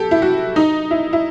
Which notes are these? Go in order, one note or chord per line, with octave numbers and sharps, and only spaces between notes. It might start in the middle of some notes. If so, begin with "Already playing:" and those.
Already playing: G4 A4
E4
F#4
D#4
E4
E4